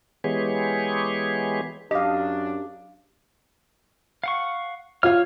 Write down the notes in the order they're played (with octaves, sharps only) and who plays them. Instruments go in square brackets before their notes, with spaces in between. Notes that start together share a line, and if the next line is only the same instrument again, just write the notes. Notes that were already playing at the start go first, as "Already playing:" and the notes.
[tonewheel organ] E3 G#3 B3 G4 G#4 C#5
[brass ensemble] F#2 D4 [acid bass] G4 [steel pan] D#5 F5
[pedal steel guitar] F5 F#5 C#6
[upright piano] F4 F5 [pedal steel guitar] C#5 F6